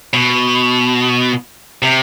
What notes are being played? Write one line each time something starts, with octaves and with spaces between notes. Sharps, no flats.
B2
C3